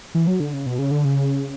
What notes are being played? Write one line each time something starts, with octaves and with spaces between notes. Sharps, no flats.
E3
F#3
D3
C#3
B2
C#3
D3
C#3